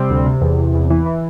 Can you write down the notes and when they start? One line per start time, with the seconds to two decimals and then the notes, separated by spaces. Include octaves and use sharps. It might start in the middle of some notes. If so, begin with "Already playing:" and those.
Already playing: C3 G3 C4
0.10 D2
0.26 C3
0.41 E2
0.58 E2
0.74 E2
0.90 E3
1.06 E3